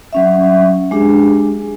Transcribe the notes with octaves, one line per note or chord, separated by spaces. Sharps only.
F#3 C#4 E5
G#3 D4 G4 G#4